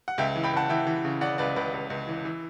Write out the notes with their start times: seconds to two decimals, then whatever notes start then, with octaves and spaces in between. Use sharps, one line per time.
0.08 F#5
0.18 C#2 E5 G5
0.36 E3
0.44 G5 B5
0.53 C#2 F#5 A5
0.69 E3 E5 G5
0.87 E3
1.05 C#3
1.21 C#3 D5 F#5
1.38 C#2 B4 D5
1.56 C#2 B4
1.74 C#2
1.90 C#2
2.08 E3
2.25 E3